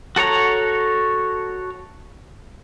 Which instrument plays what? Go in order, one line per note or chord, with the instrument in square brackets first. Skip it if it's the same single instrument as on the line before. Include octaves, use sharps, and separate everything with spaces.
[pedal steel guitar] F#4 A4 C#5 A#5